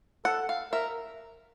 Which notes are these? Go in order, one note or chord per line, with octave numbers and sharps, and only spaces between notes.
A4 F#5
F5
A#4 E5